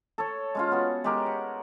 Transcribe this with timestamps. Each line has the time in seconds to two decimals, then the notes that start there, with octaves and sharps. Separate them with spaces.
0.18 A4 C#5
0.55 G#3 C#4 F4
0.72 B3 F#4
1.04 G#3 G4 A#4
1.26 F#5